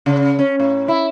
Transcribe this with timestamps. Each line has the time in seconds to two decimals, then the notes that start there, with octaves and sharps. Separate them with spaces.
0.06 C#3
0.39 C#4
0.60 A2
0.88 E4